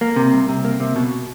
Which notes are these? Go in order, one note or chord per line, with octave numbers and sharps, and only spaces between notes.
A#3
C3
C2
C3
A#3
C3
B2